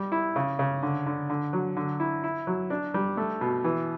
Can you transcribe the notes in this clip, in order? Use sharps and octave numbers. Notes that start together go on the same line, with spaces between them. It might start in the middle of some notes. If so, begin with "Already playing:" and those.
Already playing: G3
E4
C#3
C#3
D3
D3
D3
F#3
D3
E4
E4
F#3
D4
G3
A3
B2
E3